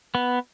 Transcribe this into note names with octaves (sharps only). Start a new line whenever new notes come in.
B3